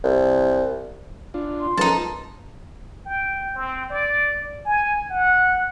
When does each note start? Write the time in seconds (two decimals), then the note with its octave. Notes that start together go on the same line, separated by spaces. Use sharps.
0.04 C2
1.34 D4 F4
1.60 C6
1.77 F3 G#3 B3 C#4 D#4 A4 A#4 A5
3.06 G5
3.55 C4
3.90 D5
4.65 G#5
5.10 F#5